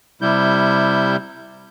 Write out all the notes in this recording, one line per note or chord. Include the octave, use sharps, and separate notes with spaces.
C3 G3 E4 G6